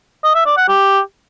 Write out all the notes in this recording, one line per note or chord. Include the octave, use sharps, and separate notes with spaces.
D#5
E5
D5
F#5
G4